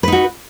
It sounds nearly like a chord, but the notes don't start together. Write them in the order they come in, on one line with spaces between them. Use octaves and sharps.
B4 D#4 F#4